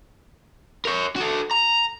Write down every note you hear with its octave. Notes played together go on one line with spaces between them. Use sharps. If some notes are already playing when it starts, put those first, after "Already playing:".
A#4 C#5
F#4 A4
A#5